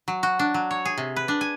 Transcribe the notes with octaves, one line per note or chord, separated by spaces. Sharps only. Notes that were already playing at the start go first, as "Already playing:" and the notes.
F#3
F#4
D4
F#3
C#5
G#4
C3
B4
D4
G#5